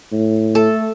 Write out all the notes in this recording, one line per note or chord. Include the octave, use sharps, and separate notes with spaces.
A2
A3 A4